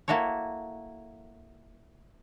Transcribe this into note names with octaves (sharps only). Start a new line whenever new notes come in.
A#3 E4 F#4 A4 C#5